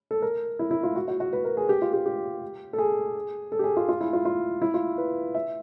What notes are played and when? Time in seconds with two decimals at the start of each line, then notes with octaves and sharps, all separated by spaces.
0.11 A4
0.22 A#4
0.59 E4
0.71 E4
0.83 F4
0.96 F#4
1.08 F#4
1.20 F#4
1.33 B4
1.45 A#4
1.57 G#4
1.69 G4
1.82 F4
1.93 G4
2.06 G4
2.73 A4
2.78 G#4
3.52 A4
3.59 G4
3.64 G#4
3.77 F4
3.89 F4
4.01 E4
4.13 F4
4.25 F4
4.62 E4
4.74 F4
4.98 B4
5.35 E5